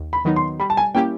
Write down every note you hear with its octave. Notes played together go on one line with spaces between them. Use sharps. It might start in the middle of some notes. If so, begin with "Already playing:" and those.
Already playing: D#2
B5
D#3 F#3 B3 D#4
C6
G3 B5
A5
G#5
A#3 C#4 E4 G4 G5